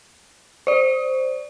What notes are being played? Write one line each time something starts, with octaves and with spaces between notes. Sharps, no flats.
C5 D5